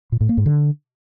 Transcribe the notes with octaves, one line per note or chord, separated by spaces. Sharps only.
A#2
A2
A#3
G#2
D3